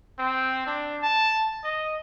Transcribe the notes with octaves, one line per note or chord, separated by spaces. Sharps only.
C4
D4
A5
D#5